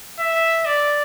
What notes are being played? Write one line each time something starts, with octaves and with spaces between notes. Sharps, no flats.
E5
D5